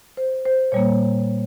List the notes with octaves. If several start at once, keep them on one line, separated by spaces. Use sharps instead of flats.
C5
C5
A#2 G3 A#3 C#5